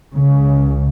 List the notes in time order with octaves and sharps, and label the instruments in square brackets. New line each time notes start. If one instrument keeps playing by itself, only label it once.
[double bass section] C#2 C#3